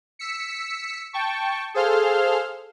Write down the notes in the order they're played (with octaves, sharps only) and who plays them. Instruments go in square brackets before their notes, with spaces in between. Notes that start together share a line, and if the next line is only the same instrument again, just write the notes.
[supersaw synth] E6 B6 C#7
G5 A5 C#6
G#4 A4 C5 F5 C6 F6